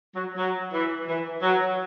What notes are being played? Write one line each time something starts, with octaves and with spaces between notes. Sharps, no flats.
F#3
F#3
E3
E3
F#3